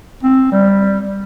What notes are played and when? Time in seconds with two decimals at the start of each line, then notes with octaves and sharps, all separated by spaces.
0.23 C4
0.52 G3